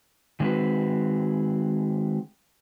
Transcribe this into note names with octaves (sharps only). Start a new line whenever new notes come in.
D#3 G#3 A3 C4 F#4 B4